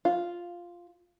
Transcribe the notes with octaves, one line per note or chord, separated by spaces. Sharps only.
F4